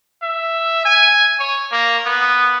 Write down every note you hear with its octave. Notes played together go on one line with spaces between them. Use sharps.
E5
G#5
C#5
A#3
B3